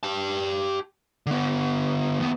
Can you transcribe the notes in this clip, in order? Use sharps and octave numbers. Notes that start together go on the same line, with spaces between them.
G4 A5
D3 B3
D#2 B3